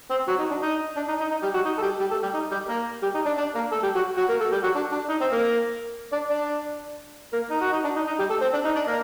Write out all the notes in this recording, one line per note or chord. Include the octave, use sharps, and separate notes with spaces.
C4 C5
F#3 F#4
D#4
D4
D#4
D4
D#4
D#4
D#4
G3 G4
F#3 F#4
D#4
A4
G3 G4
G3 G4
A3 A4
G3 G4
D#4
G3 G4
A#3 A#4
G3 G4
D#4
D4 D5
D4 D5
A#3 A#4
A3 A4
G3 G4
F#3 F#4
F#3 F#4
A#3 A#4
A3 A4
G3 G4
F#3 F#4
D4
D4
D#4
C4 C5
A#3 A#4
D4 D5
D4 D5
A#3 A#4
D#4
F#4
D#4
D4
D#4
D#4
G3 G4
A3 A4
C4 C5
D4 D5
D#4 D#5
D4 D5
A#3 A#4